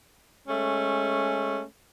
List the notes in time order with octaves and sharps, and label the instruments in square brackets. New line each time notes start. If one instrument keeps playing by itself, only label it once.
[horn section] G#3 A3 C#4